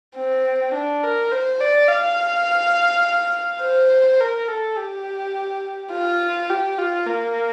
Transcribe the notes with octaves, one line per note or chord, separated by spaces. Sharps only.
C4
D4
A#4
C5
D5
F5
C5
A#4
A4
G4
F4
G4
F4
A#3